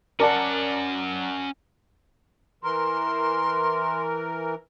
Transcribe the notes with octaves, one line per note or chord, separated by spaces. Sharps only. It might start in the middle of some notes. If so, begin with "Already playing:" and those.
C#4 A#4 D5 F#5 A5
E3 A#4 C6